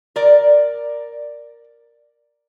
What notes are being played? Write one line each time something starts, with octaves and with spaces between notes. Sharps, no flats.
A#4 D5